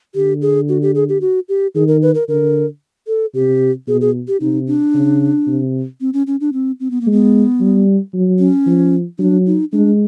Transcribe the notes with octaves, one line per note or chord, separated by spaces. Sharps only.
D3 G4
G#4
F#4
G4
G#4
G4
F#4
G4
D#3 G#4
A#4
B4
A#4
D3 A#4
A4
C3 G4
B2 G#4
G#4
G4
C3 D#4
D4
C#3
C3
C4
C#4
C#4
D4
C4
C4
B3
A#3
G#3
B3
G3
F#3
C#4
F3
F#3 D4
D#4
G#3 D4